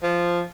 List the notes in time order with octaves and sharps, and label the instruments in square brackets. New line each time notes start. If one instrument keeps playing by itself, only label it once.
[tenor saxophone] F3